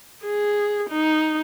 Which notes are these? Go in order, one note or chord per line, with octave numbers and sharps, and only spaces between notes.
G#4
D#4